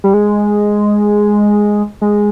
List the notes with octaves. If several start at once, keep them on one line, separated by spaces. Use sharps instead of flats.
G3
G#3
G#3